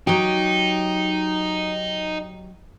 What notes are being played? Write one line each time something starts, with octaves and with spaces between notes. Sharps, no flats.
F#3 D#4 G4